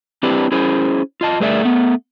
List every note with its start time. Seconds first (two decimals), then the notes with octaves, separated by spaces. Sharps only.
0.23 C4 D4 E4 G4 B4
0.52 C#4 E4 G#4 C5
1.21 F4 D#5 A5
1.40 G2 A3 G#4 A#4 D5 E5
1.61 A3 B3